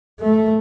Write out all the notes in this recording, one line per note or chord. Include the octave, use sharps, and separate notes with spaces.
A3